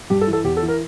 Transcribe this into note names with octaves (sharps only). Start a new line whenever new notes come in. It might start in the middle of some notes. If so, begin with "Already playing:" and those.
G2 G4
A4
E3
A4
E2 G4
A4
E3
A#4